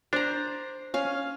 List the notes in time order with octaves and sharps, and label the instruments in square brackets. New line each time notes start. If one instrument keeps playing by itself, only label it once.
[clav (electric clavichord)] D4 [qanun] C5 A#5
[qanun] C#4 F5